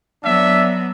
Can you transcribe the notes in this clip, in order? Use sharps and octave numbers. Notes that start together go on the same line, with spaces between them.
F#3 B3 D4 E5